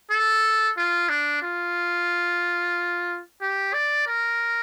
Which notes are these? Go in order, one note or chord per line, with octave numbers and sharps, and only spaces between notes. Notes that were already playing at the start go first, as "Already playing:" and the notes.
A4
F4
D4
F4
G4
D5
A#4